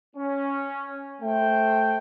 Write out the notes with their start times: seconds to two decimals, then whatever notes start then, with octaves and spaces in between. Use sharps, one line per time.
0.16 C#4
1.22 A3 C5 G5